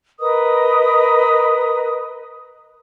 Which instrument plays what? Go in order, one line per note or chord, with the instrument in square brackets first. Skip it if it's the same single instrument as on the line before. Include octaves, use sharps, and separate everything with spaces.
[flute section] A#4 B4 D#5 D#6